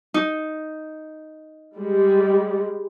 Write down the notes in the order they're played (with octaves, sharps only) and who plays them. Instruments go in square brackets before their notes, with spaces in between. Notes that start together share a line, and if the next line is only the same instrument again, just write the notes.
[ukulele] D#4
[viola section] G3 G#3